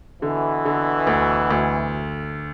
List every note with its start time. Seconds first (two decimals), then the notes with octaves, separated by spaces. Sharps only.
0.22 B2 D3 E3
0.65 D3
1.07 D2
1.51 D2